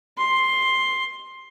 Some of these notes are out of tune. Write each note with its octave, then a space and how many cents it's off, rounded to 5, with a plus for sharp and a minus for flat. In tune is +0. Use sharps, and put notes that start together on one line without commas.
C6 +10